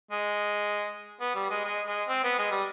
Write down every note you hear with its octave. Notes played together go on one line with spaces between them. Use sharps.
G#3
B3
G3
G#3
G#3
G#3
C4
B3
G#3
G3